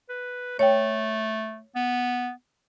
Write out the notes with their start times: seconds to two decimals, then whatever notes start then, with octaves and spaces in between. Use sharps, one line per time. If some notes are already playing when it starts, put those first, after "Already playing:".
0.09 B4
0.59 A3 C#5 G5
1.76 B3